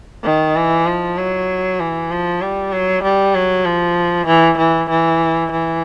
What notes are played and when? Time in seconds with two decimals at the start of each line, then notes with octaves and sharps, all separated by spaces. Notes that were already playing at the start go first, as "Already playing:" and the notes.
0.24 D#3
0.56 E3
0.86 F3
1.18 F#3
1.80 E3
2.10 F3
2.41 G3
2.72 F#3
3.03 G3
3.34 F#3
3.65 F3
4.27 E3
4.58 E3
4.90 E3
5.51 E3